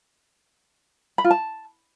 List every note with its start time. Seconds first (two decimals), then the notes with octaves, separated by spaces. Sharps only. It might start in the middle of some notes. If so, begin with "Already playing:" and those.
1.18 B5
1.24 F4
1.31 A5